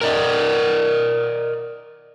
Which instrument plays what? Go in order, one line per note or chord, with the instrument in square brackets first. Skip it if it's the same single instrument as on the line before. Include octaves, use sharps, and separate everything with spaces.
[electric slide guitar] A#4 D5 D#5